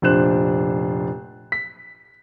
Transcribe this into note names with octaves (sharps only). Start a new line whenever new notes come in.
F1 A#2 D4 C5 F#6 E7
B6